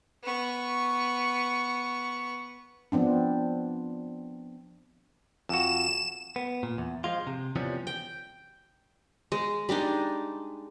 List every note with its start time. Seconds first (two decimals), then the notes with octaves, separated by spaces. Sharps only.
0.24 B3 C#6
2.92 F3 B3 C4 D4
5.49 F2 F#4 E7
6.36 B3
6.63 A#2
6.78 E2
7.04 F3 G#3 F4
7.27 C3
7.56 E2 C3 E3 F3 G3 C#4
7.87 G5
9.32 G#3
9.69 G3 G#3 D4 D#4